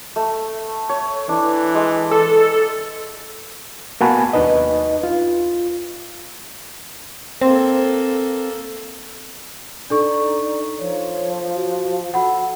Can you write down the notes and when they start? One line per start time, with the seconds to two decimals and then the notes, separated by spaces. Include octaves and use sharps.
0.16 A3
0.89 C#5
1.29 E3 D4
1.75 G#3
2.11 A4
4.01 A#3 B3 F#4 G#5 A5 B5
4.33 D#2 D4 D#4 B4 D#5
5.03 F4
7.41 A#3 C4 A4
9.90 D4 D#4 A4 D5 C#6
10.79 F3 C#5
11.55 F#4
12.14 F#4 A4 F#5 B5